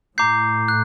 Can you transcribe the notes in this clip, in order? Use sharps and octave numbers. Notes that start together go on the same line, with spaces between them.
A2 A#5 D6 G6 C7
F#6